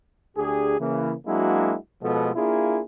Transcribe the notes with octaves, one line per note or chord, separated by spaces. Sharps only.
D2 D4 G4 G#4
C#3 E3 A#3
F#3 G#3 A#3 D4 E4 F#4
B2 F3 G#3 B3 A4
A#3 D4 E4 F4 G#4